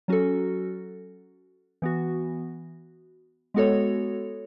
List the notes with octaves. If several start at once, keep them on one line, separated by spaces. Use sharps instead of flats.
F#3 C#4 F#4 A4
E3 B3 F#4
G#3 B3 F#4 A4 C#5